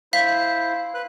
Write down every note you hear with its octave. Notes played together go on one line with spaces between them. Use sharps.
E4 C5 F5 B6
B4 F#6